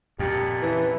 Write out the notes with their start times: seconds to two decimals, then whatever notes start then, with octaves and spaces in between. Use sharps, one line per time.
0.19 F2 A#2 G4
0.62 C#3 E3